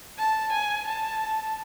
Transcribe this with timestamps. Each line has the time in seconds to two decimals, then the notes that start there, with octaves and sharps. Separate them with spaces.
0.18 A5
0.53 G#5
0.87 A5